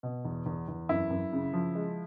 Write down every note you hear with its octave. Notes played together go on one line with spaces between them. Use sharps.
B2
E2
E2
E2
F#2 E4
F#2
C#3
F3
G#3